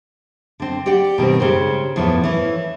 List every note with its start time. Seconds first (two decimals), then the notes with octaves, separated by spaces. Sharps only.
0.60 D3 C4
0.86 G4 D5 F#5 G5
1.18 B2 D#3 G3 C4
1.40 G#2 C#3 G4 C5
1.96 E2 A2 F3 B3
2.24 E3 A3 C#4